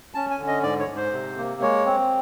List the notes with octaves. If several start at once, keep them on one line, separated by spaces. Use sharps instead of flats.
C#4 A5
G#5
D3
D#5
G#2 D5
C#5
G#2
C5
C3
A#3
G#3 C#5
C4